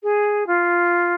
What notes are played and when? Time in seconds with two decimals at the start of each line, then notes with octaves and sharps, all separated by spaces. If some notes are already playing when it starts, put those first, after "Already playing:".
0.03 G#4
0.46 F4